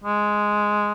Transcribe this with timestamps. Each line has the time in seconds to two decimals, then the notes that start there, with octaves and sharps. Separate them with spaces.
0.03 G#3